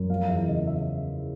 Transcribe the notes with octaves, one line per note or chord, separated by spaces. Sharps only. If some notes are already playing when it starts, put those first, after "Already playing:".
Already playing: F#2
F3 F5
E2 E5
C#3 D#5
E5